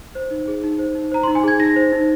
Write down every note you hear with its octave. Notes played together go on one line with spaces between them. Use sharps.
C5
D#4
G#4
D#4
C5
D#4
C5 A#5
D#4 C6
G#5
G#4 G#6
D#4 A#6
C5
D#4